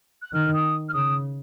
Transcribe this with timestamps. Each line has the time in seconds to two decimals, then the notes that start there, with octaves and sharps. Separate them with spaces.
0.22 F#6
0.33 D#3 F6
0.53 D#6
0.89 F6
0.93 C#3 D#6